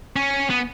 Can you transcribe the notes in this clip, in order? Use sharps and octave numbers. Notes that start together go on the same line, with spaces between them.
C#4
B3